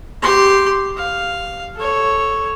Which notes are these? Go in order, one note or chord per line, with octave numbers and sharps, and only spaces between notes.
G4 C6
F5
A4 C#5